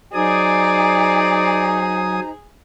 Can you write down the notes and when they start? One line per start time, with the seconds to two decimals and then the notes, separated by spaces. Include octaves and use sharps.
0.14 F#3 D#4 G#4 C5 D5 G#5 A#5 D#6